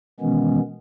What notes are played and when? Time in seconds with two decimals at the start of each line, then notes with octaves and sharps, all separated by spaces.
0.20 B2 D#3 E3 G#3 B3 C#4